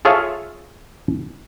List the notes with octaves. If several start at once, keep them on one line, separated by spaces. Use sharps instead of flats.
F4 G#4 A4 C#5 E5 F5